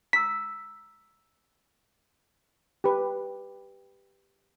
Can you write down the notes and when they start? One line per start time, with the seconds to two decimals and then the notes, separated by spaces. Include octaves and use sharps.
0.13 A#5 E6 B6
2.84 G4 B4